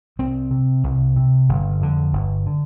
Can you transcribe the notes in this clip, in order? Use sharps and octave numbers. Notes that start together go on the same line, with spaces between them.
C2 C4
C3
C2
C3
G1
F2 D3
G1
D3